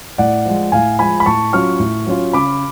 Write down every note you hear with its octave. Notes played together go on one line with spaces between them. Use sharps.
A2 D5 F#5
F3 G#3
A2 F5 G#5
F3 G#3 G#5 B5
B5
A2 A5 C#6
F#3 C#4 F4 C#6 F6
A2
F#3 C#4 F4
C#3 B5 D6